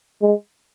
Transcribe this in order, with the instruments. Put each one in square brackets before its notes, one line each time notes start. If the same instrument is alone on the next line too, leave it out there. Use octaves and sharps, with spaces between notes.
[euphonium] G#3